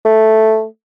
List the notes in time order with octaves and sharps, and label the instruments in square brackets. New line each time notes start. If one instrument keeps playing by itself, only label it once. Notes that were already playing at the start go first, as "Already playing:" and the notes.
[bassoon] A3